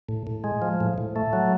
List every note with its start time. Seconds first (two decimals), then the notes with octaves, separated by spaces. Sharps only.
0.09 A2
0.27 A2
0.44 G#3
0.62 F3
0.80 A2
0.98 A2
1.16 A3
1.33 F#3